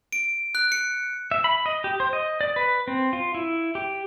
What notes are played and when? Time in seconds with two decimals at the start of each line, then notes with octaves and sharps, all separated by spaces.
0.13 D7
0.55 F#6
0.72 C#7
1.31 E5
1.44 B5
1.66 D#5
1.84 G4
2.00 C5
2.13 D#5
2.41 D5
2.56 B4
2.88 C4
3.13 F4
3.34 E4
3.75 G4